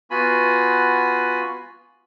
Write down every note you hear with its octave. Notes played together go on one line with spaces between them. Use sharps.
B3 F4 F#4 G#5 B5